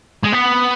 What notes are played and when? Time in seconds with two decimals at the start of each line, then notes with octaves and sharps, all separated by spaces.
0.23 G#3
0.32 B3